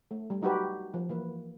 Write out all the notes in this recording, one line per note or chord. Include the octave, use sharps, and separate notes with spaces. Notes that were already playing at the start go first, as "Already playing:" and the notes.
A3
G3
F#3 D#4 F#4 G4 B4
F3
E3 A#3 B4